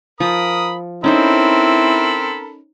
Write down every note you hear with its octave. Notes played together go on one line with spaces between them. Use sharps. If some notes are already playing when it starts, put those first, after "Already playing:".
F3 A#4 B5 D#6
C4 C#4 D#4 E4 A4 A#4 C5 B5